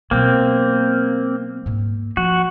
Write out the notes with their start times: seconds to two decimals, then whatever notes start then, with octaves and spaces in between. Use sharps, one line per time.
0.11 B2 F#3 A#3 C4
1.66 G#2 A#3
2.17 F3 F#4